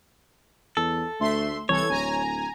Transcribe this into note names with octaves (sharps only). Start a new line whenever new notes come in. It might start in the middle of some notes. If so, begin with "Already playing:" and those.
E2 A4
D2 A3 E5 C6
C2 E3 A4 C#5 G#6
D1 G#5 A#5